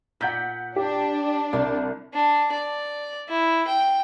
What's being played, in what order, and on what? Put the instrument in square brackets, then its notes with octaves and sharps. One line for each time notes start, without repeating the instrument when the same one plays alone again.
[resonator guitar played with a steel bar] A#2 [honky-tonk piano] F#5 G6 B6
[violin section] D4 [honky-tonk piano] G4
[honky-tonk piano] C2 [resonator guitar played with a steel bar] D5
[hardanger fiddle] D4
D5
E4
G5